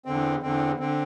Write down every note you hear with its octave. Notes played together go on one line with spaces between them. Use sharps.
E2 D3 C4
E2 D3 C4
D3 C4